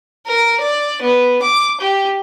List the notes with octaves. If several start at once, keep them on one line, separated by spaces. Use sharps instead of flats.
A#4
D5
B3
D6
G4